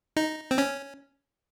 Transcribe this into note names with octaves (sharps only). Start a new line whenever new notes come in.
D#4
C4
C#4